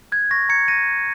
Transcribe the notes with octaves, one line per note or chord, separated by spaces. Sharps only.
F#6 G#6
C#6 A#6
A#5 G#6 C#7
F#6 A#6 D#7